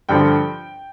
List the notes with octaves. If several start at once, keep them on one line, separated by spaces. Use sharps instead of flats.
G2 D3 F3 G5